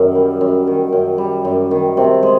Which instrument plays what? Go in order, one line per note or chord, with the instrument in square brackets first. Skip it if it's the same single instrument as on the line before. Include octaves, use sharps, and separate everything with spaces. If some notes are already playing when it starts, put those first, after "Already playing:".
Already playing: [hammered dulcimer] F#2 D#3
G3
F#2
D#3
F#2
G3
F#2
D#3
C3
G#3